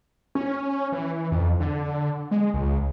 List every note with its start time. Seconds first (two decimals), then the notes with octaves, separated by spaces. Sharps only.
0.35 C#4
0.92 E3
1.32 F2
1.60 D3
2.31 G#3
2.54 C#2